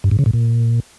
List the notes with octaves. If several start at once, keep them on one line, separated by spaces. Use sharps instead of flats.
G2
G#2
C#3
A2
A#2